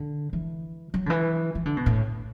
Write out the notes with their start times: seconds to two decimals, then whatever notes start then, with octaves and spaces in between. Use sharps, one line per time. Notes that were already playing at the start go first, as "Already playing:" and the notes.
Already playing: D3
0.33 E3
0.94 F#3
1.06 D3
1.10 E3
1.55 E3
1.65 D3
1.77 B2
1.86 A2